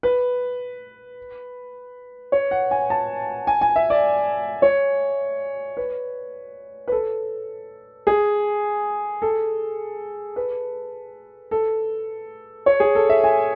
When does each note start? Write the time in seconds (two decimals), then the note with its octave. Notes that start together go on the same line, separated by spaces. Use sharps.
0.03 B4
2.32 C#5
2.51 F#5
2.71 G#5
2.90 A5
3.47 G#5
3.61 G#5
3.76 E5
3.90 D5
4.62 C#5
5.77 B4
6.88 B4
6.92 A4
8.07 G#4
9.22 A4
10.36 B4
11.51 A4
12.66 C#5
12.80 G#4
12.95 A4
13.09 E5
13.24 G#5